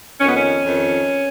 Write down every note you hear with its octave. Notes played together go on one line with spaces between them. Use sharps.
F2 D#3 C#4
B3
C#4
F2 D#3